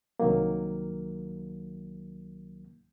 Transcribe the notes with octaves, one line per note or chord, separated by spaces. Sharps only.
C2 D#3 F#3 A#3